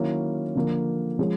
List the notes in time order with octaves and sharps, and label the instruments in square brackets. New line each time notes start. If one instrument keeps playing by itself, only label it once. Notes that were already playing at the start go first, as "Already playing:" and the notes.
Already playing: [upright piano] D#3 F#3 A#3 C#4 E4
D3 F3 A#3
F3 G#3 C#4